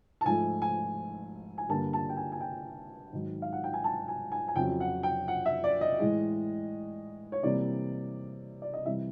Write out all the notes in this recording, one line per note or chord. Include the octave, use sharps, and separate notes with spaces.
A5
G#2 F3 A3 G#5
G#5
G#5
G2 D3 G3 A#3 A5
A5
G5
G#5
G#5
G5
G#2 D#3 F#3
F5
F#5
G5
G#5
A5
G#5
G#5
G#5
F2 C#3 F#3 G5
F#5
G5
F#5
E5
D5
D#5
A2 E3 G#3
C#5
C3 E3 G3 A#3 D5
D5
D#5
C3 E3 G3 E5